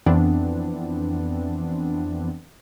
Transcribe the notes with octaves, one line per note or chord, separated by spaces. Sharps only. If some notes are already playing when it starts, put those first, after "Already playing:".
F2 E3 B3 C4 D4